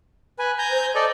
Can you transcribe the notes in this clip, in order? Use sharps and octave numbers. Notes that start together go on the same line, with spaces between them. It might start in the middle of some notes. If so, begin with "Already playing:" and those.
B4 G#5
G#5 A#5 G6
C5
A4 D5 D#5